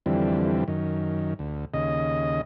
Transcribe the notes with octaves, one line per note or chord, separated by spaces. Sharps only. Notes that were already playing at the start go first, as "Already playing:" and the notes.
F2 D3 E3 G3 C4
F#2 D#3
D2
D#2 C#3 D#5